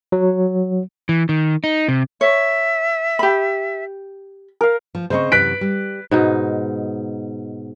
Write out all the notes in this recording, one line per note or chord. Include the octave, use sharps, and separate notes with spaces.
F#3
E3
D#3
D#4
C3
C#5 E5
G4 B5
A#4 F5
F3
C#3 C4 C5 D#5 C#6
F#2 C3 E3 B4 F#6 B6 D7
G3
G#2 B2 D#4